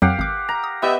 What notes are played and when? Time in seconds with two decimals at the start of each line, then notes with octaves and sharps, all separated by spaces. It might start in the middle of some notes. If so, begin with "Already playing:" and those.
0.02 F2 F#3 G4 F5 F#5
0.19 G#1 D6
0.49 A#5
0.64 D#6
0.82 B3 G4 D#5 E5